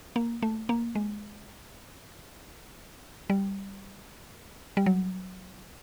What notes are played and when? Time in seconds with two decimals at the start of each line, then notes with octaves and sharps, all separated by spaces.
0.16 A#3
0.43 A3
0.69 A#3
0.95 G#3
3.30 G3
4.77 G3
4.86 F#3